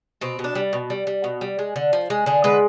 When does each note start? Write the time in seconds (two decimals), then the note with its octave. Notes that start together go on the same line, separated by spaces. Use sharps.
0.21 B2 C4
0.39 B2
0.44 D4
0.55 G3
0.73 B2
0.90 G3
1.07 G3
1.24 B2
1.41 G3
1.59 G#3
1.76 D3
1.93 F3
2.10 G#3
2.26 D3 G#4
2.44 G#3 B4